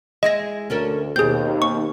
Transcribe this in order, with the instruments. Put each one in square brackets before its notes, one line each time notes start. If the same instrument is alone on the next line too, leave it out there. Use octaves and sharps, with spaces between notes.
[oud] G#3 E4 G#4 [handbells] D#5 A#6
[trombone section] D2 [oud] C#4 A4 A#4
[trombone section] D#2 [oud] B2 C4 [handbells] G#4 G6
[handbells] C#6